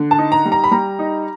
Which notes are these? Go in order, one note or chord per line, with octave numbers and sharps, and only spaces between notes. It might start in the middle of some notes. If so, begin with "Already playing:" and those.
Already playing: D3
A5
D#4
A#5
G3
A#5
B5
G3 A#5
D#4